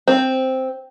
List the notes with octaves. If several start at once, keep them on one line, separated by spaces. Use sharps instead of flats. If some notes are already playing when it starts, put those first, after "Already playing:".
C4